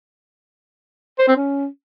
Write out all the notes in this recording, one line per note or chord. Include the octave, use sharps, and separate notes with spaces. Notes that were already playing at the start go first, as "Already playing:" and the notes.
C5
C4
C#4